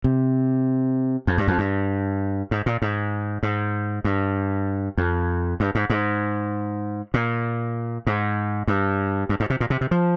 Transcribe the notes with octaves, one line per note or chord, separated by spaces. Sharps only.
C3
F2
G2
F2
G2
G#2
A#2
G#2
G#2
G2
F2
G2
G#2
G#2
A#2
G#2
G2
G2
G#2
C3
A#2
C3
C3
F3